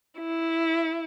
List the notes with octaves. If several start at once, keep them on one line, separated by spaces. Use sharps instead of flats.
E4